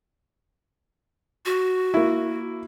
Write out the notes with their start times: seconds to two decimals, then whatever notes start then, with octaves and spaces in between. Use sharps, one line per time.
1.46 F#4
1.94 A#3 E4